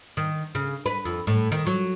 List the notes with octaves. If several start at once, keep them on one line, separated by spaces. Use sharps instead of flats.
D#3
C#3
B4
F2
A2
D#3
F#3